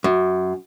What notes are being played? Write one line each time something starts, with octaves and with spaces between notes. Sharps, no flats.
F#2